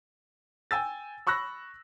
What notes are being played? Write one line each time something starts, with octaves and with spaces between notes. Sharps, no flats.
G5 G#5 E6 A6
B5 C#6 E6 F#6 A#6